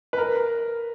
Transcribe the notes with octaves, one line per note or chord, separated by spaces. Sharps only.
B4
A#4